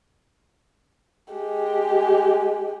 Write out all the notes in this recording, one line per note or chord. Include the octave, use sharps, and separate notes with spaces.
G#3 G4